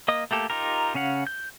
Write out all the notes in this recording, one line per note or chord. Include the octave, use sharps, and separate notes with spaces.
A#3 D#5 D#6
A3 A#3 G4 A4
D#4 F4 G4 A#4
C#3 C#4 F5 F#5
G6